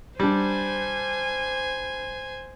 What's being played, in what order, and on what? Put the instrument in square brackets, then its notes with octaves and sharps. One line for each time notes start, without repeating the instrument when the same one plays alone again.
[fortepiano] G3 D4 [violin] C5 G#5